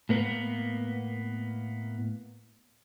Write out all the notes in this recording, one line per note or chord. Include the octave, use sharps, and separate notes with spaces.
A2 A#3 B3